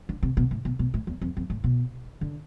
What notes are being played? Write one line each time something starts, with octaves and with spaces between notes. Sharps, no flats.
D3
C3
B2
A2
B2
B2
A2
E2
F2
F2
A2
B2
D3